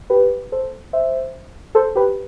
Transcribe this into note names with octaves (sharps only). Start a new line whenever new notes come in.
G4 B4
A4 C5
C5 E5
A4 C5
G4 B4